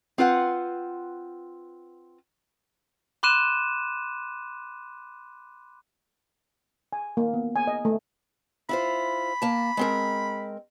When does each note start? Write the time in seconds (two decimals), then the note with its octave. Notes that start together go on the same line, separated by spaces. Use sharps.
0.18 C4 F4 B4 F#5
3.23 B5 C6 D6 F#6 D#7 E7
6.93 G#5
7.17 A#3
7.34 B3
7.56 G#5
7.67 D#5
7.85 A3
8.69 E4 F4 C5 B5
9.42 A#3 A5
9.77 G#3 C4 A#4